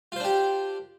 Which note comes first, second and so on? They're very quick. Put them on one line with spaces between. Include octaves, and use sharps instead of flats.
F4 C5 D4 G4